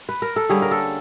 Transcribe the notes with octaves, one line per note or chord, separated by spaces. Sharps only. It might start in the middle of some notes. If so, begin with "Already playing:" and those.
B4
A#4
A4
D3 G3 A#3 C#4 G#4
A#4
A4